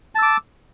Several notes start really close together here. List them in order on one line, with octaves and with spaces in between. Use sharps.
A5 E6 D6